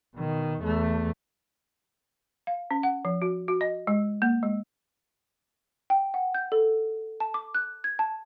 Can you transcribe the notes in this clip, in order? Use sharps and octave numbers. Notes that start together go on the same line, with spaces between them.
B2 D#3
E2 A3
F5
C#4
F#5
F3
F#4
F#4
D#5
G#3
A#3
G#3
G5
F#5
G6
A4
A5
D6
F#6
G#6
A5